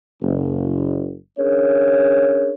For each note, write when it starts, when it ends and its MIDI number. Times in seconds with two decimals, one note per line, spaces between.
0.22 1.15 30
1.39 2.52 61
1.39 2.52 62
1.39 2.52 68
1.39 2.52 70
1.39 2.52 73